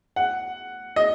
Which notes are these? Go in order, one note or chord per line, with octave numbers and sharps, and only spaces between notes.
F#5
D#5